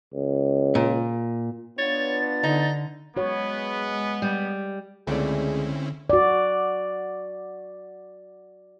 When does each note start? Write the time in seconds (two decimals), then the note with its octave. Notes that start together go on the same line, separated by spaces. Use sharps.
0.13 C#2
0.75 A#2
1.78 B3 D4 F4 C#5 A6
2.43 D3 D#4
3.17 G#3 B3 F#4 C#5
4.22 G3
5.07 C#2 D3 A3 C4 C#4 E4 G#4 D5
6.10 F#4 D5